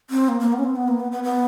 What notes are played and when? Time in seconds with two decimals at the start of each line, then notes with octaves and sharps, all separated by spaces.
0.10 C4
0.29 A#3
0.40 A#3
0.53 B3
0.58 C#4
0.64 C4
0.76 B3
0.88 A#3
1.00 B3
1.12 B3
1.23 B3